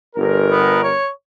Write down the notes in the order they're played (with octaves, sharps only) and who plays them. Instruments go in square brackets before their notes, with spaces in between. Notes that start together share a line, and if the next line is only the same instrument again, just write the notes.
[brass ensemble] G1 A#4
[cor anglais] B3
C#5